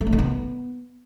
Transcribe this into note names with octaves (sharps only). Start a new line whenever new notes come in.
A3
D4
D#3
B3